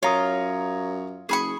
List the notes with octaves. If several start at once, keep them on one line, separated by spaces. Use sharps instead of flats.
F#2 F4 C#5 A#5 D#6
F#1 G#4 B5 C#6